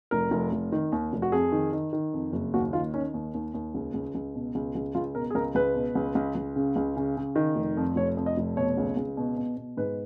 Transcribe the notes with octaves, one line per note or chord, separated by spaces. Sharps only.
F1 A#4
F1
F1
D#3
D#2
F1
F#4
F2 G#4
D#3
D#3
D#3
F2
F#1
D#2 F#4
D#3 F4
D#3 C#4
D#2
D#2
D#2
C#2
C#2
C#2
B2
C#2
C#2
C#2 F4
B2 A#4
G#4
C#2 A#4
C#2 B4
B2
C#2
C#2
C#2
C#3
C#2
C#3
C#3
D#3
F1
F2
F1 C#5
F2
D#5
F1
B2 C#5
C#2
C#2
B2
B2
B2
G#2 B4